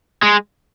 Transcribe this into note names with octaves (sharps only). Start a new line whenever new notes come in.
G#3